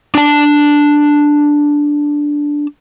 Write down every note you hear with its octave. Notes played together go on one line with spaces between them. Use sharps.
D4 A5